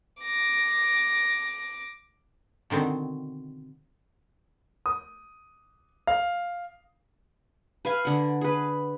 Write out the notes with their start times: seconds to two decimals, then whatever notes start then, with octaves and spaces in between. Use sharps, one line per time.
0.23 D6 A#6
2.70 B2 D3 D#3 C4
4.86 D#6
6.07 F5
7.85 B4 F5 G#5
8.05 D3 F#5
8.41 G#4 B4